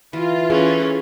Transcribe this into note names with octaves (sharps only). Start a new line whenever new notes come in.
E3 F4
E3 C#4 G#4 A4